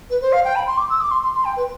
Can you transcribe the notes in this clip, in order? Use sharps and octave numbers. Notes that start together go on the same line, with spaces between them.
B4
C5
F5
G5
B5
C6
D6
E6
D6
C6
C6
C6
G5
B4